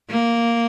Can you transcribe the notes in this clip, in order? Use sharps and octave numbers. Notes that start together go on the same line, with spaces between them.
A#3